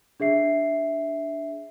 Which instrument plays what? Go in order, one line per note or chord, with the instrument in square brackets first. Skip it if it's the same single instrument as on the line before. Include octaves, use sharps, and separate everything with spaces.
[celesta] D4 G#4 E5 C7